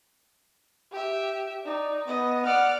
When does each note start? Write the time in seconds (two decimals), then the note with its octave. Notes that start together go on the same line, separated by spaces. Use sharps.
0.92 G4 E5
1.65 D#4 D5
2.08 B3 D#5
2.46 D5 F#5 F6